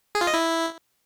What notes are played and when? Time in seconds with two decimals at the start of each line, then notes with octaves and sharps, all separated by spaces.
0.15 G#4
0.21 F4
0.27 D#5
0.33 E4